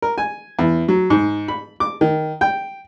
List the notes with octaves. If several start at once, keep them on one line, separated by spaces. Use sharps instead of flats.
A#4
G#5
E2
F#3
G#2
B5
D6
D#3
G5